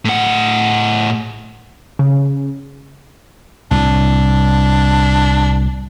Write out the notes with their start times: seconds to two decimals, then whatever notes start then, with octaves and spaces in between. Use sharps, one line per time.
0.05 A2 F#5
1.99 C#3
3.71 C2 A2 D4